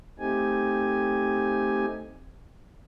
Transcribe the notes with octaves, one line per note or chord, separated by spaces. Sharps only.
A3 C4 D#4 G4 G#5